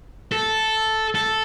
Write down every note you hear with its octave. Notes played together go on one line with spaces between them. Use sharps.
A4
A4